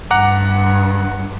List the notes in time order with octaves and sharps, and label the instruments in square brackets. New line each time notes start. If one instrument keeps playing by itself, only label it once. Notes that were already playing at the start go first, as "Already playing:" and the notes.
[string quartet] G2 [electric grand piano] F#5 A#5 D6